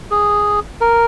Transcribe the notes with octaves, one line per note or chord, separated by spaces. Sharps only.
G#4
A#4